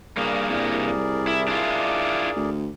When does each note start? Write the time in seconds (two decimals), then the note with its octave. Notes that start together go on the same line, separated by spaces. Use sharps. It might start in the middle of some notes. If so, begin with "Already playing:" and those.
0.17 G2 A#3 G#4 A#4 D5
0.51 C2
1.27 E4
1.48 D4 E4 F4
2.36 D2